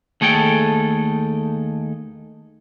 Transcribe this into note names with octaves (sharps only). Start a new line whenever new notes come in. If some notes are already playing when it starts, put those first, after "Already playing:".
D#2 A3 G#4 A4 G5